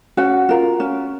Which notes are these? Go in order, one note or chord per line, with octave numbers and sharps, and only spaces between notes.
C#4 F#4 F#5
F4 A#4
C#4